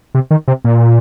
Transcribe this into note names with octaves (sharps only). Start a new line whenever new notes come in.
C3
D#3
C3
A#2